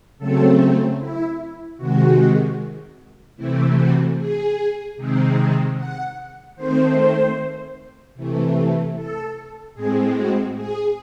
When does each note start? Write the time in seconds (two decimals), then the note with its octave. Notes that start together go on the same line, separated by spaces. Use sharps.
0.18 C#3 F#3 A3 C4 A4
0.99 E4
1.78 C3 D#3 G#3 F#4
3.37 C3 E3 A3 C4 E4
3.77 F#4
4.17 G#4
4.96 C3 D#3 G#3 C4
5.76 F#5
6.56 D#3 A3 C4 C5
8.15 C3 E3 A3
8.95 A4
9.74 A2 G#3 C4 G#4
10.15 F#4
10.55 G#4